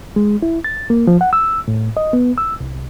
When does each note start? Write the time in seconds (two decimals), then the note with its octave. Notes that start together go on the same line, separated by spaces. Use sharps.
0.16 G#3
0.42 E4
0.64 A6
0.90 A#3
1.07 F3
1.21 F#5
1.33 E6
1.68 A2
1.97 D#5
2.13 B3
2.38 E6
2.61 C2